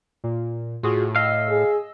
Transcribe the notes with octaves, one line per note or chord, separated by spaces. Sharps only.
A#2
A2 F4 F#4 G#4
D#5 F5 E6
G#4